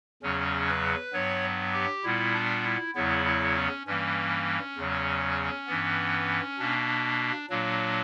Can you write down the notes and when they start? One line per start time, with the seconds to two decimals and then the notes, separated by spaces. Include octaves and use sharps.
0.23 E2 C#3 F#3 C#4
0.68 B4
1.13 G2 F#3 B3 C#5
1.73 G4
2.04 A#2 G3 B3 E4
2.34 D4
2.65 E4
2.95 E2 C#3 F#3 B3 E4
3.25 E4
3.55 C#4
3.86 G2 E3 G3 A#3 C#4
4.76 E2 C#3 F#3
5.67 G2 E3 B3
6.59 B2 A#3 D4
7.50 A#2 F#3 A#3 D4